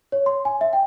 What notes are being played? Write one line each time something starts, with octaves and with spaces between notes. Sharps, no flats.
C#5
C6
G#5
E5
G5